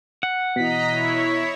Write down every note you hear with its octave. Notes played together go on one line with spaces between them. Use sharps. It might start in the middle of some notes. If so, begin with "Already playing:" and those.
F#5
B2 E3 D#5 A#5 B6
E4 C#5